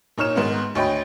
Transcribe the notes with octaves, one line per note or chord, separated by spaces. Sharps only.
A#2 D#4 C#5 F6 E7
G#2 D#3 B3 D#4
D2 C#5 D#5 G5 B5